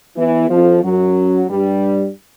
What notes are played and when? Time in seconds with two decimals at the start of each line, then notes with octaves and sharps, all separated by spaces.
0.17 E2 E3
0.50 F2 F3
0.83 F#2 F#3
1.49 G2 G3